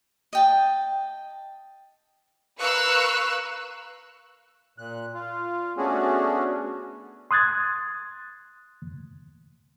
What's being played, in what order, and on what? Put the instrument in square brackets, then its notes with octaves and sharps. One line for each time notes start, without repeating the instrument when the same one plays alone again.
[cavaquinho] D#5 G5 A5
[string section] A#4 B4 F5 C#6 E6 F#6
[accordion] A#2 F#6
F4
A3 B3 C#4 D4 F#4 G#4
[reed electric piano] C6 D#6 F#6 G#6 A6